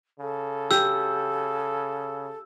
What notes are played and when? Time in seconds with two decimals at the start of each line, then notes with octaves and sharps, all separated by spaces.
0.20 C#3 A4
0.71 G4 E6